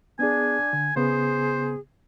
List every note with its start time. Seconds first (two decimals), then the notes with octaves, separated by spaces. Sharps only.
0.19 B3 D4 G#4 G#5
0.73 D3
0.96 C#3 B3 G#4 C5